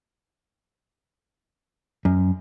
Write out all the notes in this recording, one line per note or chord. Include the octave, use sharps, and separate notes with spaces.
F#2